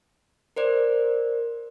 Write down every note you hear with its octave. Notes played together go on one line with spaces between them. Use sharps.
A#4 C5 D5